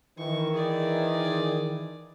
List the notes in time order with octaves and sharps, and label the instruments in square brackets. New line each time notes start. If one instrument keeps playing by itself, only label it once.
[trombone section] D#3 E3 [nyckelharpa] C#6
[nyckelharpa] G#4 D5